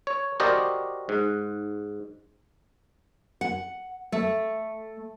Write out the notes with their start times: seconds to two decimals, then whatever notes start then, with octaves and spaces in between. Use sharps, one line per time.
0.07 C#5
0.40 F#4 G4 A#4 C5 D5 D#5
1.09 G#2
3.41 F#5
4.12 A3